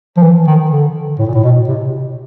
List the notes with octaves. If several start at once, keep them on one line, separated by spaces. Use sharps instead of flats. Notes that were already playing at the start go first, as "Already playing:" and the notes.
F3
E3
D#3
D3
A2
A#2
A2
B2
C3